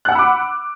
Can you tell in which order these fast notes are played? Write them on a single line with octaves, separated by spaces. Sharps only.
F#6 F#5 E6 B5 D6